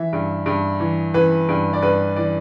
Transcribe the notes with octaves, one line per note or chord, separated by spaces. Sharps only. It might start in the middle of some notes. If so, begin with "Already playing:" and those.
Already playing: E3 E5
G2
G2
E3
E3 B4
G2
D5
G2 B4
E3 D5